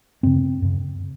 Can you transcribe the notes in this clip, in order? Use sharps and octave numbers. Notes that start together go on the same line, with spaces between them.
F#2 C#3 C4
F#2 C#3